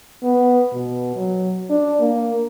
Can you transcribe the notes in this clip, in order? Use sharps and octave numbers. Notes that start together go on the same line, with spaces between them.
B3
B2
F#3
D4
A#3